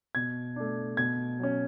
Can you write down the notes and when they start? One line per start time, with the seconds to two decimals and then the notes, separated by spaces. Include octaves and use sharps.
0.15 B2 G#6
0.56 A3 D4
0.97 B2 G#6
1.39 F#3 C#4